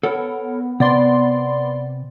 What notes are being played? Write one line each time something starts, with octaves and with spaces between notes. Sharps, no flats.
B3 A4 A#4 C#5
C3 B3 D5 C6